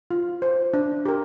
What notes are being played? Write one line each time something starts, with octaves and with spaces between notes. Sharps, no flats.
F4
C5
D4
G4 A#4